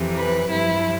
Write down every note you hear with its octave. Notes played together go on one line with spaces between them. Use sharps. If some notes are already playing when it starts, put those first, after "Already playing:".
Already playing: F2 C3 E3
B4
G2 F3 E4